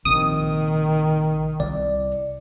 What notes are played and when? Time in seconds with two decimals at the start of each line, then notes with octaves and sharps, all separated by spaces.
0.05 A#1 C3 D#3 D#6
1.60 C2 D5